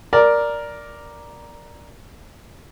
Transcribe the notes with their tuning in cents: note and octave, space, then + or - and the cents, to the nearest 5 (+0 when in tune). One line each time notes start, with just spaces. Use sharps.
A#4 +5 D5 +0